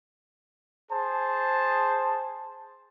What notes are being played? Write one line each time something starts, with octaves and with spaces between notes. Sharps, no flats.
G#4 C5 A5